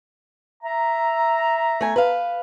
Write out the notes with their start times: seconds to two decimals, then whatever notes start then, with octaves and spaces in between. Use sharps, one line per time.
0.63 E5 A#5
1.81 A3 G#5
1.96 B4 F5